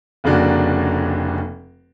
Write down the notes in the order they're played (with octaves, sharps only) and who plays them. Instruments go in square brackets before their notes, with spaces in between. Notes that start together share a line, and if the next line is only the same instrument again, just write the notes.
[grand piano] F1 F2 C#3 A#3 D4 F#4